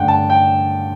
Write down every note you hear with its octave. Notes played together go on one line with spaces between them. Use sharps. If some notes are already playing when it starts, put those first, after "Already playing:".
Already playing: G2 D3 A3 C#4 F#5 G5
A5
G5